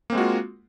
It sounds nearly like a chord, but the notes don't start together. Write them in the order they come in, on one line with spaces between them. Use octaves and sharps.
A#3 C4 G#3 F#4 F4